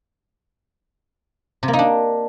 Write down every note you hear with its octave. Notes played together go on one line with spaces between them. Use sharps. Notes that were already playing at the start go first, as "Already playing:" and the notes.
C3
A#3
D#4
D4